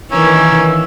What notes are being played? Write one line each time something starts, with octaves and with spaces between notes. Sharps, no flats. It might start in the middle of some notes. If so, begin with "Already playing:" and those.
D#3 E3 A#3 C#4 E6